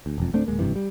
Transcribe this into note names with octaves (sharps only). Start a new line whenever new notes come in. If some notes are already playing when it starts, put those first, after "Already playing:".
D2
E1 F2
D1 A3 C4 D4
D1 G1 G#3 A#3
F#1 G2 C3 E3
G3